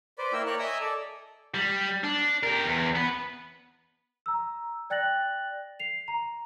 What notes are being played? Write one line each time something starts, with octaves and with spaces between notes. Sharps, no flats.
B4 C5 D5
A#3 E4 A#4 G5 E6
A#4 C#5 D5 F#6
D#5 E5 G#5 A#5 D#6 E6
A4 D5
G3
D4
G4 A#4
E2
B3 B4
A#5 E6
D5 G5 F#6 A6 A#6 F#7
C7 F7
A#5